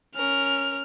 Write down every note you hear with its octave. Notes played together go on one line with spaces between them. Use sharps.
C#4 A#4 F6